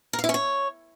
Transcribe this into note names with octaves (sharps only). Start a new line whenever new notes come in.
A#4
F5
E4
C#4
C#5